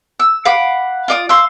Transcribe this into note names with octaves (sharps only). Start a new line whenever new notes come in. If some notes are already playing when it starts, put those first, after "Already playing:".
E6
F5 F#5 B5 D6
F4 D5 D#6
F5 C6 E6